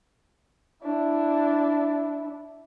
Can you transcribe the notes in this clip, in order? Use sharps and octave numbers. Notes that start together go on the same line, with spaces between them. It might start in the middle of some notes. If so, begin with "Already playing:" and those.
D4 E4